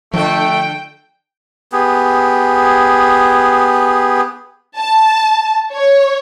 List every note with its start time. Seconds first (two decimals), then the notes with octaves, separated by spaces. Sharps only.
0.14 D3 F3 A3 A4 G5
1.72 B3 G4 G#4
4.77 A5
5.74 C#5